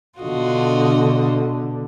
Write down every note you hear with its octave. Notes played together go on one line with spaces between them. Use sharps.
B2 D3 F4 F#4 D#5